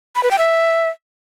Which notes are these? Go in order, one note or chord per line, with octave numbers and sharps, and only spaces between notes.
B5
B4
G5
E5